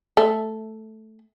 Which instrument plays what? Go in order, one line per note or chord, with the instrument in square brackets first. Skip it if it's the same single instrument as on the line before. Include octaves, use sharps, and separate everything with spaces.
[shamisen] A3